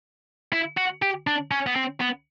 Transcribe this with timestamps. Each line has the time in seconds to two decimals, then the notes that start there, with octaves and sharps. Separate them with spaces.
0.52 E4
0.77 F#4
1.02 G4
1.27 D4
1.51 C#4
1.67 B3
1.76 C4
2.00 B3